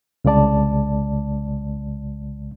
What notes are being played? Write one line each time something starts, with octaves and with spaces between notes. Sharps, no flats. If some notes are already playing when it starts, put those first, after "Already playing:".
C2 C#3 G#3 D5 A5